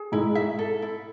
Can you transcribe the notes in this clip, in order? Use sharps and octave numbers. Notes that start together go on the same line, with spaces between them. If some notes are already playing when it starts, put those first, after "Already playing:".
Already playing: G#4
G#2 G#3 E4
E5
A4
E4